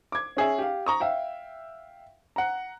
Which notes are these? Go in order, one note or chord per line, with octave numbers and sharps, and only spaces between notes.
D6 G#6
C#4 G#4 E5
G4 F5
A#5 C#6 D#6
E5 F5 G5
F#5 A#5